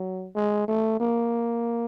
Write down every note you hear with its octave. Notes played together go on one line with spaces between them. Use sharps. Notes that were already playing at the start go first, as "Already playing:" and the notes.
Already playing: F#3
G#3
A3
A#3